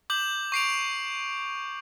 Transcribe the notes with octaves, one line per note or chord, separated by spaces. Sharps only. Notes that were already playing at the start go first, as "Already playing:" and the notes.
D6 G6 F#7
C#6 C7 D7 F7